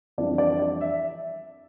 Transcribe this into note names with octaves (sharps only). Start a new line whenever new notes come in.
F2 E3 G3 D4 D5
D5
D5
E5